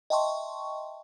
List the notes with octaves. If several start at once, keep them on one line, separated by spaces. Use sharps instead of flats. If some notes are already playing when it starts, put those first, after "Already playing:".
D#5 E5 G5 A5 C6 C#6